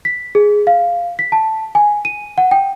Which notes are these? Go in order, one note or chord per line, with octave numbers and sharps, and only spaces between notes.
B6
G#4
F5
B6
A5
G#5
D#7
F#5
G5